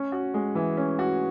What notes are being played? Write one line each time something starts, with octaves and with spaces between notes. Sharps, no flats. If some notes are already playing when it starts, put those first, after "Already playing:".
Already playing: C#4
F#4
G#3
E3
C#4
F#4